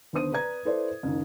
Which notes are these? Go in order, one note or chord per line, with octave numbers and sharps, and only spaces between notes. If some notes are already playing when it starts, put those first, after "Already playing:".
D#2 D3 B3 C5 D#6 D#7
B4 D5 A#5 G#6
E4 A4 B4 C5 D5
F#1 C#2 F#2 D#3